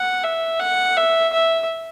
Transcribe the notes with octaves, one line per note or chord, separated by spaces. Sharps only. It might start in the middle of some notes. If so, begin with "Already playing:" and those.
Already playing: F#5
E5
F#5
E5
E5